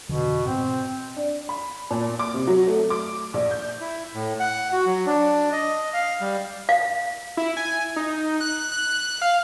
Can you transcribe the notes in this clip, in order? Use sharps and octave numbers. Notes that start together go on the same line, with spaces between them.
F2 B2 D3 E3
G#2 B2 C4
D4
B5
A#2
D6
C3
F#3
A3
D6
A#1
G6
E4
A2
F#5
F#4
F#3
D4
D#5
F5
G3
F5
E4
G#5
D#4
F#6
F#6
F5